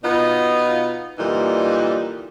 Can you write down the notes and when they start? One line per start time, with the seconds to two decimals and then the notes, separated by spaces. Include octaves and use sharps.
0.03 B2 B3 D#4 F4
1.19 A#2 D3 E3 G3 D#4